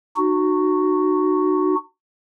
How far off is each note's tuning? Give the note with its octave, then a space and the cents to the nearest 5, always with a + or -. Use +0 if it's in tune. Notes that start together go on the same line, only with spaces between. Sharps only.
D#4 -35 F#4 +0